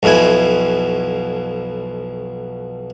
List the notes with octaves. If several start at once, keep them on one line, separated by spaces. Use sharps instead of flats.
B1 F2 B2 E4 G#5